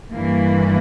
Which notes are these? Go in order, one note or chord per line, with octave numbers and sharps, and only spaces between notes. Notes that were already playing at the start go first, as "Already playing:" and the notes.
G2 E3 A#3